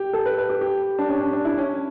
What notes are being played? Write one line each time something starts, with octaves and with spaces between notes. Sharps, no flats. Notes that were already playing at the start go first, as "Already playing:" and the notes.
Already playing: G4
A4
B4
B4
G4
G4
D4
C#4
C#4
D4
E4
C#4